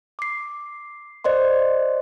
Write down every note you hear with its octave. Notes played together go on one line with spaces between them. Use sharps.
D6 C7
C5 D5 D#5 C6